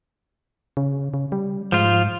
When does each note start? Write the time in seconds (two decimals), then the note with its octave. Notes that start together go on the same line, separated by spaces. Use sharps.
0.77 C#3
1.14 C#3
1.32 G3
1.72 G#2 F3 F4